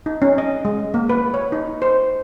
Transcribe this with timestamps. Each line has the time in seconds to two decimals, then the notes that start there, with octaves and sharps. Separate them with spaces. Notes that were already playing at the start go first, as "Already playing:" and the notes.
0.06 D#4
0.22 C#4
0.38 D#5
0.65 G#3
0.94 A#3
1.09 B4
1.34 C#5
1.52 D#4
1.82 C5